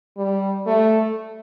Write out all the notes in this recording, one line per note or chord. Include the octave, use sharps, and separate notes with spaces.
G3
A3